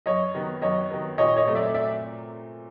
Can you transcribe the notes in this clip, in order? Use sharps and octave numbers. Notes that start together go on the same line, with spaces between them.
F#2 C#5 D#5
D#3 F#3 B3
F#2 C#5 D#5
D#3 F#3 B3
A#2 C#5 D#5
C#5 D#5
F#3 A3 C4
D5 E5
D5 E5